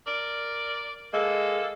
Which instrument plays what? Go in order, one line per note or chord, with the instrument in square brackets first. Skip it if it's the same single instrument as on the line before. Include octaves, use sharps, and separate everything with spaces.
[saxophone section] A#4 D5
[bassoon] G#3 [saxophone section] A#3 A4